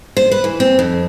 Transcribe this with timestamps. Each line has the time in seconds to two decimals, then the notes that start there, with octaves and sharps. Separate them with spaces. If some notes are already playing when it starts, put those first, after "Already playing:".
0.17 C5
0.31 B4
0.44 E3
0.60 C4
0.79 F2